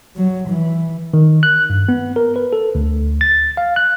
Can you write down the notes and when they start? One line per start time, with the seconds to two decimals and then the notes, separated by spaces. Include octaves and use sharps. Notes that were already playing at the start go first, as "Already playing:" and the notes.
0.16 F#3
0.49 E3
1.14 D#3
1.43 F#6
1.70 G2
1.89 B3
2.16 A#4
2.36 B4
2.53 A4
2.75 D2
3.21 A6
3.57 F5
3.76 F#6